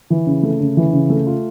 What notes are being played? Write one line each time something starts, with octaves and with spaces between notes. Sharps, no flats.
E3
C#3
A3
C#3
E3
C#3
A3
F4